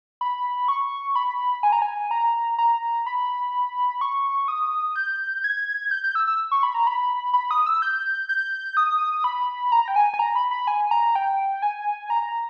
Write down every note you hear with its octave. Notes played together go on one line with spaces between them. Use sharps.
B5
C#6
B5
G#5
A#5
G#5
A#5
A#5
B5
C#6
D#6
G6
G#6
G6
G6
E6
E6
C#6
B5
A#5
B5
B5
D#6
E6
G6
G6
D#6
B5
A#5
G5
G#5
G#5
A#5
B5
B5
G#5
A#5
G5
G#5
A#5